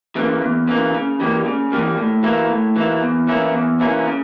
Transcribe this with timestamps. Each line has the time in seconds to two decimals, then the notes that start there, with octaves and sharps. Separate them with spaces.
0.16 C#3 E3 A#3
0.41 E2
0.68 C#3 E3 A#3
0.94 C#3
1.20 E3 G3 A#3
1.45 C#3
1.72 E3 G3 A#3
1.97 A2
2.23 E3 A#3 E4
2.49 A2
2.76 E3 A#3 E4
3.02 E2
3.27 E3 A#3 C#4 E4
3.53 E2
3.80 E3 A#3 C#4 E4
4.06 C#3